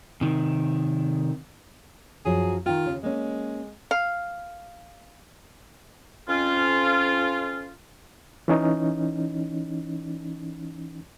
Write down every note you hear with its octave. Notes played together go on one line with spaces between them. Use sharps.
C3 D#3
F#2 F3 F#3 G#4
D#3 F4 G5
D#2 C#3
G#3 A#3 C#4
F5
F2 C#4 F4
E3 C#4 D#4